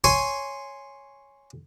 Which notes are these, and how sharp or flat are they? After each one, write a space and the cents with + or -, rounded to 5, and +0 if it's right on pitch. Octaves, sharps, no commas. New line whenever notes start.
C#5 +0 G#5 +0 C6 +0